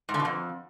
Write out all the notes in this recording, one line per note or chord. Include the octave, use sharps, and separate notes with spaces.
G#2
D3
B2
F2